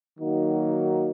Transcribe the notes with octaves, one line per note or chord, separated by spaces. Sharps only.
D#3 F#3 A#3 D#4 F#4